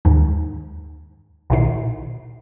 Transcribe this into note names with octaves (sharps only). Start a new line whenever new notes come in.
D#2 G#2
B1 A#2 D#3 E4 C7